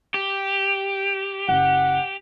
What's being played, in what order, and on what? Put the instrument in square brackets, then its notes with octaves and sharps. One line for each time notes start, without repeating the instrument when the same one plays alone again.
[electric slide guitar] G4
[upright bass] F#1 [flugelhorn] F#5